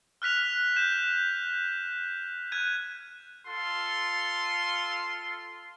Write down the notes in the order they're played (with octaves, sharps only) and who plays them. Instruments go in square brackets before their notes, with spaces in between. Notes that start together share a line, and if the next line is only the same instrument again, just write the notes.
[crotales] F6 F#6 B6 F7
G6 E7
F#6 G#6 D#7
[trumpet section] F4 A4 C6